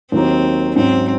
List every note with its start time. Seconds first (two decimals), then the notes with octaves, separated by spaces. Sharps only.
0.12 D#2 D#3 F#3 A#3 C4 D#4
0.76 G#2 F#3 C4 C#4